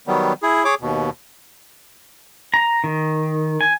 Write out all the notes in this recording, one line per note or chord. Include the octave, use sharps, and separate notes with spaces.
D#3 F#3 G3 B3
E4 G#4
G#4 C#5 D6
D#2 B2
A#5
D#3
G#5